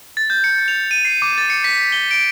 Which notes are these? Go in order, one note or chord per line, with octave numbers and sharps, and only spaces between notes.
A6
G6
C#7
F7
D#7
C7
D6
A6
C#7
B6
G7
D7